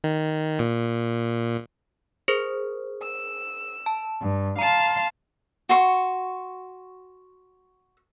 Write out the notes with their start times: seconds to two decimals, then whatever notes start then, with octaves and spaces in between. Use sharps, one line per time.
0.04 D#3
0.59 A#2
2.28 G#4 A#4 C5
3.01 E6
3.86 A5
4.20 G2
4.59 F5 A5 A#5 C6
5.69 F#4 C6 C#6